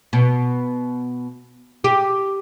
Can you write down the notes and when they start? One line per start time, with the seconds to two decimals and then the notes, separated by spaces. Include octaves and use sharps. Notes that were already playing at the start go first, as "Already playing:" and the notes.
0.13 B2
1.84 G4